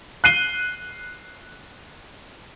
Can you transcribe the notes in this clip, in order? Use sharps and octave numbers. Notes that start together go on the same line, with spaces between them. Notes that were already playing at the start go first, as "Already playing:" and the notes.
F#6 C7 D#7 G7